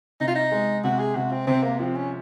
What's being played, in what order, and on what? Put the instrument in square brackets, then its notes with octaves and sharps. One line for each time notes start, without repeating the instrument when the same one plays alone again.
[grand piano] C3 [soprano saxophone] D#4
[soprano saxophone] F4
D#4
[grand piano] G#3
[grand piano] C3 [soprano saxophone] F#4
[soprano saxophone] G#4
[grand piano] C3 [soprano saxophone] F#4
[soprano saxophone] C4
[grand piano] C3 [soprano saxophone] C4
[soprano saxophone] A#3
[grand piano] F3 [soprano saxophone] C4
[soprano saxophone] C#4